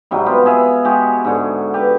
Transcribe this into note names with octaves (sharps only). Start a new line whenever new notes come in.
G#2 C3 F#3 G3
B3 F4 G4
G#4 E5 F5
G#3 F#4 G4
G#2 D3 C#6
G4 B4